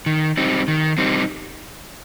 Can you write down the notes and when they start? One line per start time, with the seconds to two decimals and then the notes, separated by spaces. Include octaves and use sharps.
0.06 D#3
0.37 G3 C4 D#4
0.68 D#3
0.98 G3 C4 D#4